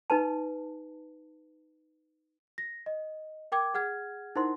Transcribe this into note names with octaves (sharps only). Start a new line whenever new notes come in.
D#4 B4 A5
A#6
D#5
A#4 G5 D6 G#6
G#4 F#5 F6 G#6
D#4 E4 A#4 C5 F#5 C6